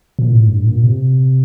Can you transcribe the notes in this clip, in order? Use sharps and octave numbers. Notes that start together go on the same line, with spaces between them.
A#2
A2
G2
A#2
C3